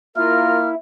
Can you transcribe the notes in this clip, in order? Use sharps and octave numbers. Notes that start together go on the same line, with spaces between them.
A#3 E4 F4 A#4 F6